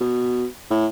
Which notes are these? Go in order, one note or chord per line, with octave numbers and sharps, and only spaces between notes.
B2
A2